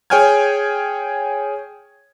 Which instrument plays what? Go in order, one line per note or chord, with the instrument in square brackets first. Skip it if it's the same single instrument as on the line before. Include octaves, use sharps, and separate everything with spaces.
[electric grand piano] G#4 C#5 G5 G#5 F6 G#6